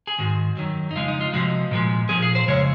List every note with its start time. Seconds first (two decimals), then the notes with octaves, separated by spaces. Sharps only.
0.07 G#4
0.18 G#2 D#3 G#3 F#4
0.57 F#2 D#3 F#3
0.91 D#4
0.95 F2 C#3 G#3 F4
1.08 D#4
1.21 F4
1.33 C3 F3 G#3 F#4
1.71 A#2 F3 G#3
2.09 A#2 F3 G#4
2.22 G#4
2.35 C5
2.47 F2 C#3 G#3 C#5